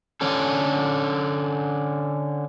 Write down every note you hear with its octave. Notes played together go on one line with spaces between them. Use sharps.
D3 C#4 A4